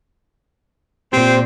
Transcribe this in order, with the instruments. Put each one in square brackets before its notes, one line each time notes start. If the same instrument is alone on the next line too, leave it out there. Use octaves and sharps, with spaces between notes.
[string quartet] A#2 [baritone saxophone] C4 [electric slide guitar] G4 C5